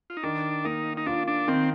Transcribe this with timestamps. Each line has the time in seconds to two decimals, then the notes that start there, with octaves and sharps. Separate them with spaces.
0.10 F4
0.17 D#4
0.23 D#3 D4
0.65 A#3 D#4
0.97 D#4
1.06 D4 F4
1.27 D4
1.48 D#3 C4